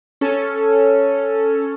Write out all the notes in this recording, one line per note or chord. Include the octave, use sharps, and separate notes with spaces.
C#4 A4